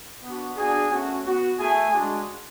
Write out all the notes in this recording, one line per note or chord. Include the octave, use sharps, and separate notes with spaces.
B3 D4 F#4
B3 D4 F#4 G#4 G#5
A3 C#4 F#4
B3 F#4
A3 E4 G#4 G#5
G#3 D4 F#4